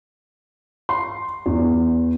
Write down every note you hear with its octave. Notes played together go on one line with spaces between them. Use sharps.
C6
E2